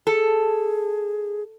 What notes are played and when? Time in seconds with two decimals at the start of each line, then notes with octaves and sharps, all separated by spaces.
0.07 G#4 A4